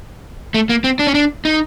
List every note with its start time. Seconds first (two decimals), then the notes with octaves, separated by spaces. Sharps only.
0.54 A3
0.69 A#3
0.84 C4
0.99 D4
1.07 C#4
1.14 D4
1.45 D#4